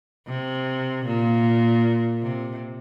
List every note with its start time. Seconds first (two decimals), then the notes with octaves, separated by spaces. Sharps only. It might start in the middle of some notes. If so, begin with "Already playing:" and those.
0.27 C3
1.06 A#2
2.22 C3